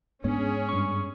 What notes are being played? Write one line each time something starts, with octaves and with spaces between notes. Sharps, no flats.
G#2 G#3 B3 C#4 D4 G#4 C#5
G2 C#6